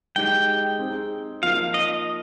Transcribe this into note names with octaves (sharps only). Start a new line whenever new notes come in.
G#3 D#4 G4 G5
C4 D#4 G#4
F3 A#3 D#4 F5
D#5